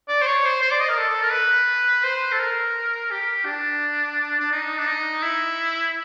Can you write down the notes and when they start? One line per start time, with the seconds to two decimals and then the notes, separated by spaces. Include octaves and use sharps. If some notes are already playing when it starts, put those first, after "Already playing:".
0.08 D5
0.22 C5
0.26 C#5
0.45 C5
0.62 C5
0.71 D5
0.80 D#5
0.89 A#4
0.98 A4
1.23 A#4
1.32 B4
2.03 C5
2.32 A4
2.39 A#4
3.10 G4
3.45 D4
4.39 D4
4.52 D#4
4.78 D4
4.87 D#4
5.23 E4